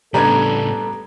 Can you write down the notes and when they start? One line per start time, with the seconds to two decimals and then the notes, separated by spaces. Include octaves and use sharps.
0.14 A2 C#3 G3 B3 D4 A4 A#5 G#6